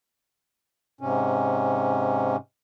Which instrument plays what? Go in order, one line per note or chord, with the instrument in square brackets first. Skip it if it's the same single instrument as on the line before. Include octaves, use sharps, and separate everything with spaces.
[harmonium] G#2 C3 C#4